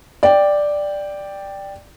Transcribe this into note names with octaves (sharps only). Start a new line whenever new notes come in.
D5 G5